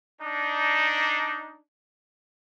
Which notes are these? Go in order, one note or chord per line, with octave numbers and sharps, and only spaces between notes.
D4 D#4